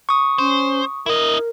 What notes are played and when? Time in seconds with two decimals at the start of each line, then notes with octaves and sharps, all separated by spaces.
0.09 C#6 D#6
0.38 C#4 C5
1.06 E4 A#4 D#5